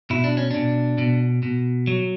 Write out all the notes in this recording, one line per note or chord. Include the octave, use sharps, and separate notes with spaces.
B2 E4
D4
C#4
B2 D4
B2
B2
F#3